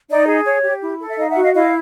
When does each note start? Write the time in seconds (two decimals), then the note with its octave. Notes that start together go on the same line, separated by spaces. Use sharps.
0.09 D#4 D5
0.27 G#4
0.45 C#5
0.64 G4
0.82 E4
1.00 A4
1.09 E5
1.18 D#4 D#5 F5
1.30 E5 F#5
1.36 F#4
1.42 D#5 F5
1.54 E4 D#5 F5